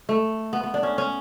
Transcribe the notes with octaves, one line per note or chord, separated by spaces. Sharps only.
A3
B3
B3
D4
C#4
C#4